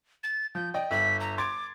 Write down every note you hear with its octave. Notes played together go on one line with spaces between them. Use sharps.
A6
F3 G6
D5 D#5 G5
G1 E5 B6
A#5
C6 D6 G#6 A6